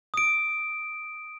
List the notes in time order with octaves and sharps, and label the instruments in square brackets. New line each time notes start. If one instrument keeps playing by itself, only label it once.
[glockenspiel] D#6 D7